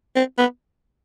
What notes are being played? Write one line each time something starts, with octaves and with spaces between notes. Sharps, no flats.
C4
B3